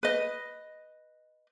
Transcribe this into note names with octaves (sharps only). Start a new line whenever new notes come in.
B4 D#5